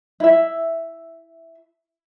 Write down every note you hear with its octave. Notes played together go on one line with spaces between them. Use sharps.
E4 E5